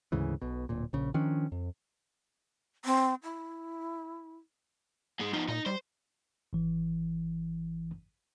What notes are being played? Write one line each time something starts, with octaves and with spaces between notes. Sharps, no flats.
D2 G#2 C#3 E3
B1 B2
D1 A#2
A#1 C#3
D#3 F3 C#4 D4
F2
C4
E4
G#2 G#3
F3 B3 D#4
A#2 D#4
G3 C5
G#1 E3